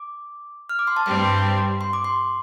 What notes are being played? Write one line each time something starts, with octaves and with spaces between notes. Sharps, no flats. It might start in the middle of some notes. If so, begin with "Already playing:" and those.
Already playing: D6
F6
D6
C6
A5
G2 G3 C4 G4 C6
C6
D6
C6